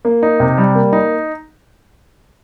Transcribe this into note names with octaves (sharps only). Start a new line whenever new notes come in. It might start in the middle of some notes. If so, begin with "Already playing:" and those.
A#3
D#4
C3
G3
A#3
D#4